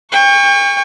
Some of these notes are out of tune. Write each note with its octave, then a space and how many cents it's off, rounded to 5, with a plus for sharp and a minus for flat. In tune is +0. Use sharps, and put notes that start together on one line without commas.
G5 +40 C#6 +0